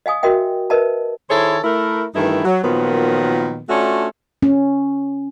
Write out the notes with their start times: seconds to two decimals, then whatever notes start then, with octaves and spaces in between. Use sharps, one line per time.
0.06 D#5 F5 G#5 D#6
0.23 F#4 A#4 D#5 E5 G5
0.70 A#4 B4 D#5 E5 A5
1.29 D#3 E4 G#4 A4 C5 C#5
1.63 A3 E4 A#4
2.15 G2 D#3 E3 A3 D#4 E4
2.45 F#3
2.63 A#2 D#3 F3 F#3 B3
3.69 A3 C#4 D4 F4 F#4
4.43 C#4